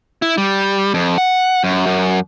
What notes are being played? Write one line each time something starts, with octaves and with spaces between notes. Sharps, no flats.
E4
G3
F2
F#5
F#2
F#2